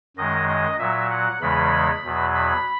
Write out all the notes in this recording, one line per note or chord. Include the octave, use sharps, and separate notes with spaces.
F#2 D#3 G#3 D#5
D#5
A#2 F#3 E5
F#5
E2 C#3 E3 G#3 B5
E2 B2 F#3
B5